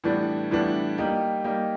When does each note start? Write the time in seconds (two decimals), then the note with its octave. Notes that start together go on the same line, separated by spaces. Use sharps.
0.04 A2 E3 G3 B3 D4
0.51 A2 E3 G3 B3 D4
0.98 G3 A#3 D#4 G4
1.44 G3 A#3 D#4 G4